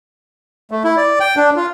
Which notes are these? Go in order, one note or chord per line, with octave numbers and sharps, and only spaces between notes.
A3
E4
D5
G5
D4
F4